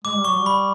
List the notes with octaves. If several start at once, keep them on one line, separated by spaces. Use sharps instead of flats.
G#3 D6
G3
F#3 C#6
G3
B5